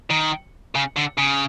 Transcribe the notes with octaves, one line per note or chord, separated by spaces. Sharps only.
D#3
C#3
D3
C#3